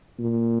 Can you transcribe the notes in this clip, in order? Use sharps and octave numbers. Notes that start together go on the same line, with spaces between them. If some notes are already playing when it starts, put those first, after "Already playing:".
A#2